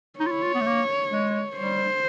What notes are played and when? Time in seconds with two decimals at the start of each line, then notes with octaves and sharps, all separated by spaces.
0.19 D#4 C#5
0.26 F4
0.31 E4
0.43 F4
0.54 B3
0.61 A3
0.66 A#3
1.11 G#3
1.57 G3 C5